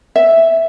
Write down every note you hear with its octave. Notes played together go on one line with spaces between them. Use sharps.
E5